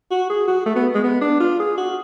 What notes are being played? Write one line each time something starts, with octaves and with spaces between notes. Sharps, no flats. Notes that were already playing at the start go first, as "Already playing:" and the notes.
F#4
G#4
F#4
A3
B3
G#3
B3
D4
F4
G#4
F#4